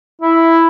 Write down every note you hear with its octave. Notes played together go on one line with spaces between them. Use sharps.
E4